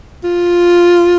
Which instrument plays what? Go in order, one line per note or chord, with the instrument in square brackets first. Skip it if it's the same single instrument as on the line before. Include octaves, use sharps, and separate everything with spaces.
[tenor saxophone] F4